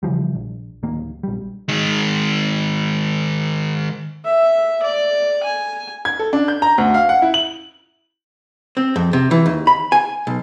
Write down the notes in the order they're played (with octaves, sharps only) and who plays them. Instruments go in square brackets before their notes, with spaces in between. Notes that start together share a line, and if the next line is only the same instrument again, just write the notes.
[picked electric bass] C#3 E3 F3 G3
A#1
D1 D#3 A#3
A#1 G3
[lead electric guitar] D#3 G#3
[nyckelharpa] E5
D5
G#5
[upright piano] G#6
A4
D4
G6
A#5
D2
F5
F#5
E4
F#7
[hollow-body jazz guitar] C4
F2
C3
E3
D#2
B5
G#5
B1